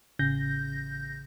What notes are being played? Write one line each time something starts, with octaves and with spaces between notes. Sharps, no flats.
A1 C#3 G6 A#6